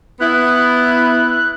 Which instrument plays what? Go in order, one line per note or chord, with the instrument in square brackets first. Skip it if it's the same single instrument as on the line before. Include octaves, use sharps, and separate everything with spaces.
[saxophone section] B3 E4 [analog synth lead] F#6